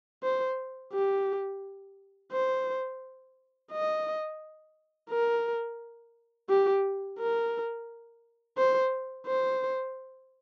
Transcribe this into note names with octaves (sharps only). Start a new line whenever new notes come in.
C5
G4
C5
D#5
A#4
G4
A#4
C5
C5